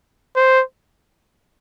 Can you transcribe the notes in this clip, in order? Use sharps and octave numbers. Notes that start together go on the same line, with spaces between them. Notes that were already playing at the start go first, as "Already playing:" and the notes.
C5